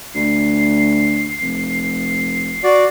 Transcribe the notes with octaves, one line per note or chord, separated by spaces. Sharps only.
D2 C7
F1
F#4 D5